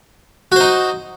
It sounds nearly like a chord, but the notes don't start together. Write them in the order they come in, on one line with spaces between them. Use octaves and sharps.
F#4 C5 D#4